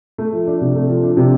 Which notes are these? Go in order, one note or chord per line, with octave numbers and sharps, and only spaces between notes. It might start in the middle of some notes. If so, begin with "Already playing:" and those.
A3
F3
D4
C3
A3
F3
D4
C3